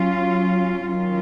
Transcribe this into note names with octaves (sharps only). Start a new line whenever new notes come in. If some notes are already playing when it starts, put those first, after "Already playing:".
Already playing: F#3 C#4 F4
D#3 F#3 C#4 F4